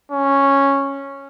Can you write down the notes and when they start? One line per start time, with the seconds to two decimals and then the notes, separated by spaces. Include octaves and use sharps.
0.11 C#4